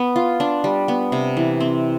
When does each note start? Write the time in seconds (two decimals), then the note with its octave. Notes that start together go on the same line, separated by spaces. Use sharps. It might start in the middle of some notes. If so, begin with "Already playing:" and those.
Already playing: B3
0.16 F4
0.40 D4
0.64 G3
0.88 B3
1.12 C3
1.37 E3
1.60 C4